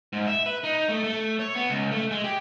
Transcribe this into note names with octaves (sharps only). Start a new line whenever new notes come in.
G#2
E5
B4
D#4
A3
A3
C#5
B3
C#2
A3
G#3
G4